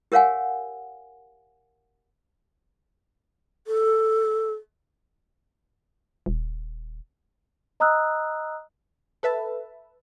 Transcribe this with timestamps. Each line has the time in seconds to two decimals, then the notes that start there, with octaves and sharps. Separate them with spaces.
0.12 G4 A#4 C#5 F5 F#5 G#5
3.67 A4
6.26 D#1
7.80 D#5 A#5 D#6 E6 F#6
9.23 A4 B4 E5 A5